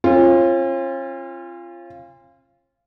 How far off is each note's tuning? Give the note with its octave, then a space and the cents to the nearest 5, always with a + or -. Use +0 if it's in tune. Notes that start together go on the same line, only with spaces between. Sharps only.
C#4 -45 F4 -15